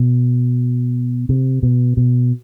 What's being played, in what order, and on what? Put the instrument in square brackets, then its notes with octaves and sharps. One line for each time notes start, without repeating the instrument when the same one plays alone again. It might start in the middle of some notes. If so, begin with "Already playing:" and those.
Already playing: [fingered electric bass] B2
C3
B2
B2